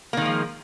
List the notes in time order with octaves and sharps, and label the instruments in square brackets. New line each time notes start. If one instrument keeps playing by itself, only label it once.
[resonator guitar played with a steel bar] A#3
D#3
G#3
F3